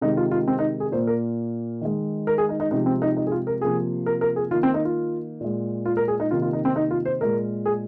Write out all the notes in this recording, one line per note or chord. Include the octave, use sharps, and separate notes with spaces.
C3 D#3 G#3 D#4
F4
F4
C4
D#4
G#4
A#2 A#3 C5
A#4
D#3 G#3
A#4
G#4
D#4
D#4
C3 F3 G#3 D#4
C4
D#4
D#4
G#4
F4
A#4
C3 F3 A#3 G#4
A#4
A#4
G#4
D#3 A#3 F4
C4
D#4
F4
A#2 G#3
F4
A#4
G#4
D#4
C3 D#3 A#3 F4
F4
D#4
C4
D#4
F4
C5
A#2 G#3 A#4
G#4